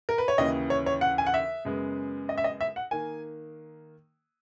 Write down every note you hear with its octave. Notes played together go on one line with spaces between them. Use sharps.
A#4
B4
C#5
D#2 C#3 E3 D#5
C#5
C#5
F#5
G#5
F#5
E5
F#2 C#3 G#3 B3
D#5
E5
D#5
E5
F#5
D#3 A#3 G#5